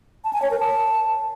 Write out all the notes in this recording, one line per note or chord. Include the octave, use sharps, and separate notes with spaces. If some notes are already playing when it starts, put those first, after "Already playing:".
A5
G#5
C#5
A#4
A5